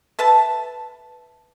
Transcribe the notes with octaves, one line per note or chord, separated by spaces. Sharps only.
A4 B4 E5 A5